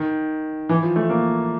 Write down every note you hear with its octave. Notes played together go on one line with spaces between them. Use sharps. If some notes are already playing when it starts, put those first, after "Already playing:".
Already playing: D#3
E3
F3
A3
A#3